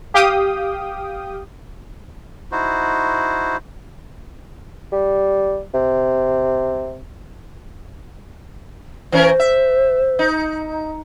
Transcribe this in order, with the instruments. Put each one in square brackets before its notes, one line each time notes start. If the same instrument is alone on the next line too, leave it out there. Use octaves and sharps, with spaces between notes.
[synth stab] G4 F5 G5 D#6
[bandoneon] D#4 E4 F#4 C5
[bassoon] G3
C3
[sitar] E3 C#4 A#4 [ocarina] C5
[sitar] E5
D#4